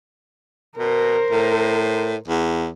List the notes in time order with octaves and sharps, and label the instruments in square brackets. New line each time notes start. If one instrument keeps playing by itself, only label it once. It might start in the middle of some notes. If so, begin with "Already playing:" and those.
[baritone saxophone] B2 [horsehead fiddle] A#4 C5
[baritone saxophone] A2
E2